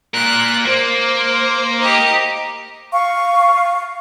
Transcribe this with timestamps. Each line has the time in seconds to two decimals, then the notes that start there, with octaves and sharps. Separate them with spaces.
0.14 A#2 A#4 F#6
0.65 A#3 C5
1.80 D#4 G4
2.93 F5 C#6